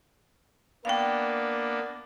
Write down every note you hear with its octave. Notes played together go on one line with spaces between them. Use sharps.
A#3 B3 D4 F5 G5